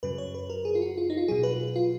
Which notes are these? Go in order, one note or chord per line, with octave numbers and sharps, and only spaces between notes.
F#2 C#3 F#3 B4
C#5
B4
A#4
G#4
F4
F#4
F4
D#4
F4
B2 F#3 G#4
B4
F4